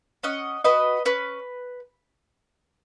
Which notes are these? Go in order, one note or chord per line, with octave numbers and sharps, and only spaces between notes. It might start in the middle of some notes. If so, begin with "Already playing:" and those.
C#4 D#5 F#5
F#4 B4 D#5
C#4 B4